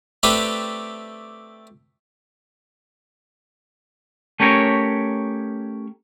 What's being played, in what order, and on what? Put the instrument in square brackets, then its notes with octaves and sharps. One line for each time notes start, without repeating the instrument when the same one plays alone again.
[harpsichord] A3 C4 D4 G4 A4 B4
[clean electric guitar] A3 C#4 G4 A#4 C#5